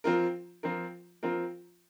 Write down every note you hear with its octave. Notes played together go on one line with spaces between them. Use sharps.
F3 C4 F4 A#4
F3 C4 F4 A#4
F3 C4 F4 A#4